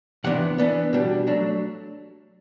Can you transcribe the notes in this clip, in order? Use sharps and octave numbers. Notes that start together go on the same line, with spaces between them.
C3 E3 B3 D4 F#5
E3 B3 D4
B2 G3 D4
F#3 A3 D4